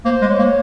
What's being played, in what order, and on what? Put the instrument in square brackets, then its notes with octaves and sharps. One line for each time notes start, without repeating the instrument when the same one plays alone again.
[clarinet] A#3 [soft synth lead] C5
[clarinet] G#3
[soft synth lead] C#5
[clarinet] A#3